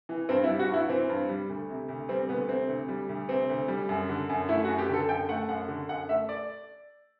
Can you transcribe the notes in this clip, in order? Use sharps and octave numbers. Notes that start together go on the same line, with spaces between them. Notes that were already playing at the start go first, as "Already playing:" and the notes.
E3
G2 C4
E4
G3
F#4
G2 E4
E3 C4
G2
G3
D2
C3
D2
G3 C4
D2 B3
C3 C4
D2
G3
D2
C3 C4
D2
G3
F#2
D3
F#2
A3 E4
F#4
F#2
G4
D3 A4
F#2 G5
A3 F#5
F#2 F#5
D3
F#2 F#5
A3 E5
D5